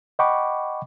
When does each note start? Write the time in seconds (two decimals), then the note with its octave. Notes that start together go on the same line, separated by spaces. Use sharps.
0.19 D#5 F#5 G5 B5 C#6 D6